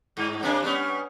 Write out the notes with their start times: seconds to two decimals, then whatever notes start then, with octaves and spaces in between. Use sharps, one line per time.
0.17 G2
0.43 C3 A#3 D4
0.63 G3 B3 C#4